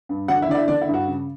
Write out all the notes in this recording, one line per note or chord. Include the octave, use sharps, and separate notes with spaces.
G2
D3 F#4 F#5
E4 E5
D3 D5
E4 E5
D3 D4 D5
E4
G2
F#4
C#3